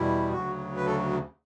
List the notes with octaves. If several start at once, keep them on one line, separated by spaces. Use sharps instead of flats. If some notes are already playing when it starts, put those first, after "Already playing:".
Already playing: E2 B2 G3 E4
D2 C#3 F#3 F#4
B4
A4